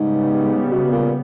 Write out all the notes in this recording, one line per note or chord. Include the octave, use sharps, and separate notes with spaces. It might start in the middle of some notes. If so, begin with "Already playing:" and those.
Already playing: G#2 C#3 G3 B3
B2
A#2